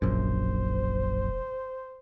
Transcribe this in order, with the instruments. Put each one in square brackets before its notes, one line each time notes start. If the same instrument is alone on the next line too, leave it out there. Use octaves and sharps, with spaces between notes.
[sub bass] E1 [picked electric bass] A#1 F#2 [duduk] C5